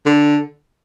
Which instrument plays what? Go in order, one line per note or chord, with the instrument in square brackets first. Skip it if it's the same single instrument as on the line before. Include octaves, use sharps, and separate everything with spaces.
[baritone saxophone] D3